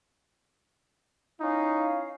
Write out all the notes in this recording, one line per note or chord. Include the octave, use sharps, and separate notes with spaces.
C#4 D#4 E4 F5